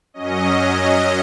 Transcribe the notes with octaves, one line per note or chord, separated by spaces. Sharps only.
F#2 F#3 C#4 D#5